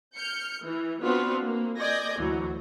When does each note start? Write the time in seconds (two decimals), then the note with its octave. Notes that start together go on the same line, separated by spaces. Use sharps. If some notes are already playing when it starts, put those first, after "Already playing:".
0.16 F6 G6 C#7
0.64 E3
1.01 B3 C4 D4 F4 F#4 B4
1.42 A#3
1.78 D5 D#5 G#5 G6 A#6
2.18 D2 E3 F#3